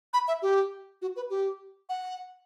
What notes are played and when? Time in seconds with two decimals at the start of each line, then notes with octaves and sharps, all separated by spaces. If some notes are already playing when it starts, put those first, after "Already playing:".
0.13 B5
0.28 E5
0.42 G4
1.02 F#4
1.16 B4
1.30 G4
1.89 F#5